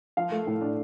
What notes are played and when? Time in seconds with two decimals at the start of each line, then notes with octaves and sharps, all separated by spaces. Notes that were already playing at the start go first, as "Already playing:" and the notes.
0.17 F3 F5
0.31 A3
0.47 A2
0.61 D4